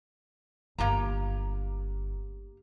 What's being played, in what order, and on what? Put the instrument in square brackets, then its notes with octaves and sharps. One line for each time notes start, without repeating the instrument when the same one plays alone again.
[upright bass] G1 [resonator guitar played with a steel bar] A#3 G4 A#5